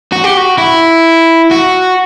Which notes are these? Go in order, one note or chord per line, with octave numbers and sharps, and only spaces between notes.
F#4
G4
F#4
E4
F#4